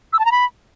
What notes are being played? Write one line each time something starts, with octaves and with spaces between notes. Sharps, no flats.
E6
A5
A#5
B5